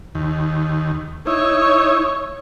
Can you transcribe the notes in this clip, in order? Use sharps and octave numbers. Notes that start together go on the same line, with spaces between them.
D#2
D#4 E4 C#5